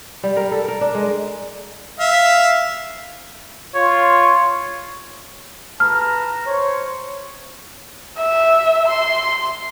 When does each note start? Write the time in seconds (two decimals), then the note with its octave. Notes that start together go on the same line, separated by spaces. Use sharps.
0.23 G3
0.37 A#4
0.52 A4
0.68 A#4
0.81 D4
0.95 G#3
1.99 E5 F5
3.75 F4 C#5
5.80 B4 A5 A#5 F6
6.46 C5 C#5
8.18 E5
8.88 C6